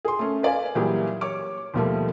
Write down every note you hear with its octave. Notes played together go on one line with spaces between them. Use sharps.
G#4 C6
A3 C#4
B4 D5 F5 G#5
A#2 E3 F#3 G3 G4 G#4
C#5 D6
D#2 B2 F3 G3 A3 A#3